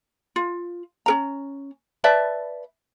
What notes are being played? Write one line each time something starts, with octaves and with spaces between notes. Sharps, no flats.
F4
C#4 A#4 A#5
B4 D5 E5 A5